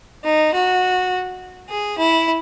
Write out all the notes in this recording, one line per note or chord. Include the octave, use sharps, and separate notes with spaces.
D#4
F#4
G#4
E4